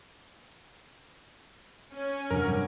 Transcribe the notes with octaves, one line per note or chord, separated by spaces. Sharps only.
C#4
G2 C3 F#3 G3 A#4